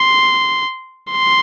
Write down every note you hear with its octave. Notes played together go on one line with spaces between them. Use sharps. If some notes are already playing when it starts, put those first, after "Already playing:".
Already playing: C6
C6